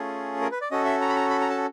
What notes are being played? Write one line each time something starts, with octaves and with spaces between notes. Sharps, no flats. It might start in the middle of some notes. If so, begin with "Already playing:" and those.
Already playing: A3 C#4 F4 G#4
A#4
B4
D5
C#4 F#4 A4 D#5
E5
A#5
B5
A#5
B5
A#5
A5